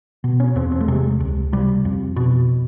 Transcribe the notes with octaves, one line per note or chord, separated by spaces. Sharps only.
B2
C#4
E2 C4
C4
A3
C3 G#3
C#2
C3 G3
F2
B2